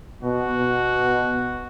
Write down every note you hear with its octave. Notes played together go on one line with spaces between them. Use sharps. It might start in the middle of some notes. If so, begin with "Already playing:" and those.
B2 F#4
B2